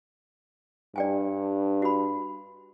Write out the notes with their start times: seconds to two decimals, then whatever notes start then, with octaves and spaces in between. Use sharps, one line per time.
0.96 G2 D5 G5 G#5
1.82 F#4 B5